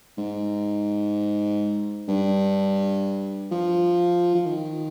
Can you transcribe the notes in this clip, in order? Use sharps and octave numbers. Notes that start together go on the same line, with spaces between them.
G#2
G2
F3
F3
D#3